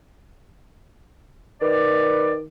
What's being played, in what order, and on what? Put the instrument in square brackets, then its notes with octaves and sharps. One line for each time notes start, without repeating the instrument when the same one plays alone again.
[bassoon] D#3 [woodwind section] B4 D5